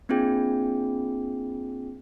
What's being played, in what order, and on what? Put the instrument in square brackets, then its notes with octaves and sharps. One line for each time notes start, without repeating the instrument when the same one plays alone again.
[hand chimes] A#3 C4 D4 F4 G#4 G5